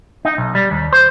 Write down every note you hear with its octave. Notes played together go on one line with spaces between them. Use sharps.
D#4
B1
G3
D#2
C5